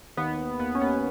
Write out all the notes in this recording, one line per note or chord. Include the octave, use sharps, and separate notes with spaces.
D#2 B3
D#2
D#2 B3
C#4
D#2 B3